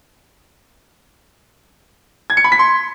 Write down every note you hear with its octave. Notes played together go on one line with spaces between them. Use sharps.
G#6
C#7
B5
B6
C6